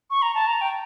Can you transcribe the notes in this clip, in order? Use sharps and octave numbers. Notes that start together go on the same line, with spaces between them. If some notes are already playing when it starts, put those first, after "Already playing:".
C#6
A#5
A5
A#5
G5